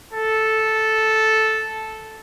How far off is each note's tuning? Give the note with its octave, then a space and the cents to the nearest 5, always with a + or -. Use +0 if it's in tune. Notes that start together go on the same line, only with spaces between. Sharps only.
A4 -5